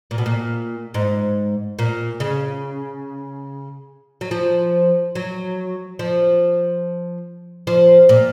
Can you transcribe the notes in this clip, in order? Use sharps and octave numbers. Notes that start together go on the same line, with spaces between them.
A#2
B2
A#2
G#2
A#2
C#3
F#3
F3
F#3
F3
F3
A#2